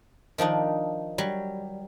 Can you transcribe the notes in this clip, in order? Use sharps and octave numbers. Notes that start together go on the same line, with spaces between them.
D#3 F3 D4 D#4
F#3 G3